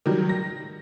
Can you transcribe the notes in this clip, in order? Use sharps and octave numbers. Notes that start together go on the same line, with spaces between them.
D#3 F#3 G3
A#6